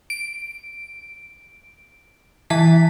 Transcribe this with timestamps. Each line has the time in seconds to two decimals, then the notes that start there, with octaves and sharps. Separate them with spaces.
0.10 D7
2.50 E3 A5 B6